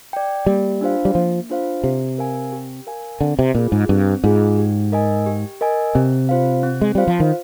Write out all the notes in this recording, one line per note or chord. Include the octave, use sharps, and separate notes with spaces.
D5 G5
G3 A#3
D4 F4 C5 F5
G3
F3 A#3
D4 F4 C5 F5
C3 G4
A#4 F5 G#5
G4
A#4 F5 G#5
D3 C4
C3
A#2 F4 G#4
G#2
G2 C4
G#2 F4 G#4
G4
A#4 D#5 G#5
G4
A#4 D#5 G#5
C3 C4
F4 C5 F5
C4
G#3
G3 F4 C5 F5
F3
D#3